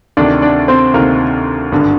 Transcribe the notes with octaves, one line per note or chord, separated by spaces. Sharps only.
D2 C3 D#3 D4 D5
D4 D5
C4 C5
D2 C3 D#3 A#3 A#4
G#1 G2 D3